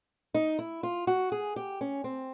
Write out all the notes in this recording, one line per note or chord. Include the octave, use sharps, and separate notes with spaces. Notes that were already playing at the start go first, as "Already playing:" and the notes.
D#4
E4
F4
F#4
G#4
G4
C#4
C4